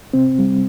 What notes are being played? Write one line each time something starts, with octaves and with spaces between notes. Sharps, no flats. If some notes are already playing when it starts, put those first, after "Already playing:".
C3 C4
G3